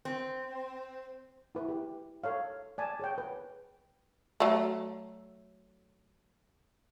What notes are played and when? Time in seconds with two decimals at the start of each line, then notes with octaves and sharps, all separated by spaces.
0.05 C4
1.55 E4 B4
1.69 G4
2.24 A4 C#5 F5
2.78 D5 G#5 A5
3.00 G#4 C#5 G5
3.18 B4
4.40 F#3 A3